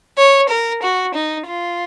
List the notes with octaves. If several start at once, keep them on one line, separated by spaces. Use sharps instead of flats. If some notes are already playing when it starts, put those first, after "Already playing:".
C#5
A#4
F#4
D#4
F4